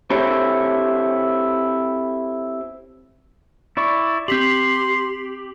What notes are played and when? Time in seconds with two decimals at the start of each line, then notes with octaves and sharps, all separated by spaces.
0.10 C4 E4 G4 A4 C5 C#5
3.77 E4 D5 C#6
4.28 C4 G4 C6 B6 F#7